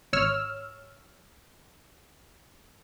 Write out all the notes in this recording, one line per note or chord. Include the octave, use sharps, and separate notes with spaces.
G#1 C#5 E6 F6